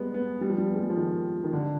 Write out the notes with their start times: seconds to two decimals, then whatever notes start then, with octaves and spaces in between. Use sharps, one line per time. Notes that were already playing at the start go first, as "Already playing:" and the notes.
Already playing: G3 G#3 B3
0.14 B3
0.41 G3
0.50 F3
0.58 G3
0.67 B3
0.75 G#3
0.82 G3
0.90 F3
0.97 D#3
1.44 D#3
1.53 D3